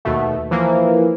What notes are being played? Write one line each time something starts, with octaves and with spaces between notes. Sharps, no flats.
D#2 B2 A3
E3 F3 A#3